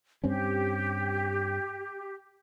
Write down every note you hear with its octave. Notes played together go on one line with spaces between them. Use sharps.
G2 C4 C#4 G4